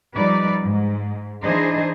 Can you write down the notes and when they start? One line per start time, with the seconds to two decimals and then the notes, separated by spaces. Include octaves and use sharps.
0.14 F3 G3 D#4 B4 D5
0.62 G#2
1.42 E3 D4 D#4 G#4 C5 D#5